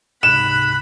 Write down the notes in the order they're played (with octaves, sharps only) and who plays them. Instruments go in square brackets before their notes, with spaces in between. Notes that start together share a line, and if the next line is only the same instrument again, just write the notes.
[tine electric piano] C#2 G#2 C3 [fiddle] B5 [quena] F#6 [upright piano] E7